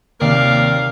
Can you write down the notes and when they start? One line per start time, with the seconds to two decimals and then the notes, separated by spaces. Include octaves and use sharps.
0.21 D#2 C3 A#4 D5 F5